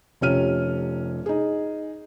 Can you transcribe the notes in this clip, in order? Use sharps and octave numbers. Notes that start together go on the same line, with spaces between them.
F1 C3 C#4 F4 F6 D#7
D#4 G#4